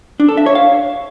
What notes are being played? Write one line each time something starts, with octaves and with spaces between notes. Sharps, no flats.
D4
A4
E5
C#5
F5